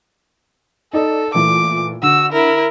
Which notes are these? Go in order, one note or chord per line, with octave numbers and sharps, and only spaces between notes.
D#4 A4 D5
A#2 E3 A3 D6
D3 F#4 E6
E4 A#4